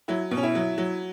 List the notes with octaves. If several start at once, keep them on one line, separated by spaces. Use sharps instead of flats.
F#3 E4
B2
C#4
E4
F#3
F#3